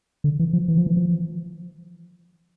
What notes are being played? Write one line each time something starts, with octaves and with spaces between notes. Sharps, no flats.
D3
E3
F3
E3
F3
E3
F3